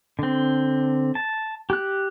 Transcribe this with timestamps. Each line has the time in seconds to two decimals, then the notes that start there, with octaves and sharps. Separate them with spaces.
0.19 D3 C4
1.15 A5
1.70 G4 F#6